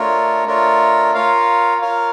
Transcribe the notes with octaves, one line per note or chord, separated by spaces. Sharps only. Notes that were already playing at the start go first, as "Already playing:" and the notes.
Already playing: A3 D4 F4 A#4 C#5
A3 D4 F4 A#4 C#5
F4 A#4 C#5 F5
F4 A#4 C#5 F5